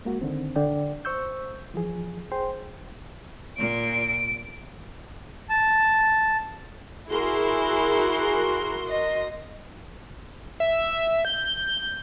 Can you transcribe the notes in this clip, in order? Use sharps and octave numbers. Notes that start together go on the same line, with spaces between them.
G#3 A#3 F#4
D3 D#3 C4
D3 D5 G5
C5 C#6 E6 G6
E3 F3 G#4
G#4 C5 G5 C6
A#2 D7
A5
E4 F#4 G#4 A#4 C6
D#5
E5
G6